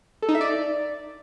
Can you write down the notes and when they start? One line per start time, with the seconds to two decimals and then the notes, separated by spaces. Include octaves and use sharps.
0.22 A4
0.29 D#4
0.35 E5
0.41 D5